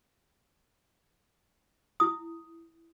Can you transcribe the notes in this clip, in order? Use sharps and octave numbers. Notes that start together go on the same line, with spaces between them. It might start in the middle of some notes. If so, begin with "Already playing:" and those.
E4 D#6